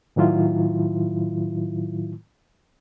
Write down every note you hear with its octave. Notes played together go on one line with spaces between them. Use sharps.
A2 D#3 F#3 E4 F4